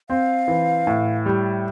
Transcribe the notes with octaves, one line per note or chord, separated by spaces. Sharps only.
C4 F5
E3
A2
G3